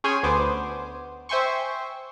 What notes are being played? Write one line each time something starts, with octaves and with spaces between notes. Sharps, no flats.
C#4 G#4 C#5 G5 G#5 C6
D2 B3 C5 D6
C5 E5 G5 G#5 C6 C#6